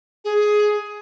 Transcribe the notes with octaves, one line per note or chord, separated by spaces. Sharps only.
G#4